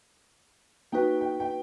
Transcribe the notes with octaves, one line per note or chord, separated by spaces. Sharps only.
A#3 D#4 F#4 B4 G5
G5
G5